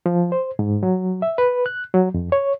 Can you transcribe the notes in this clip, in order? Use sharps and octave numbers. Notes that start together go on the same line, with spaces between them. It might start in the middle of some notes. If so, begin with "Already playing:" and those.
F3
C5
G#2
F#3
E5
B4
F#6
F#3
F2
C#5